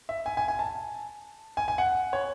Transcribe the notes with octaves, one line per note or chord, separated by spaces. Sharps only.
E5
G#5
G#5
G#5
A5
G#5
G#5
F#5
C#5